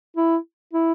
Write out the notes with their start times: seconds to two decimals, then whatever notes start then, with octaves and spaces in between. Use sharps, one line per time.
0.17 E4
0.73 E4